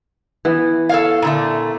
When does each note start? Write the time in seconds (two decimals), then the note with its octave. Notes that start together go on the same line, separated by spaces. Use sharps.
0.45 E3 B3
0.89 A4 C#5 F5
1.22 A#2 D3 A3